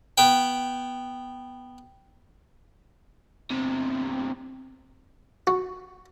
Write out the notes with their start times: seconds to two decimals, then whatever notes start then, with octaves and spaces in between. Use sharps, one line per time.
0.18 B3 G5
3.50 E2 C3
5.47 F#4